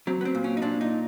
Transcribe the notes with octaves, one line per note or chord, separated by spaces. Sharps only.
F#3 C4
B3
C4
A#2
C#4
D#4
A#2 D4
D#4